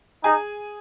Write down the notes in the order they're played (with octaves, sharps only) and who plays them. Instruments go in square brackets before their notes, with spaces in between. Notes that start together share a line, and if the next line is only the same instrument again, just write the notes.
[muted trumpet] D#4 [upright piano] G#4 G#5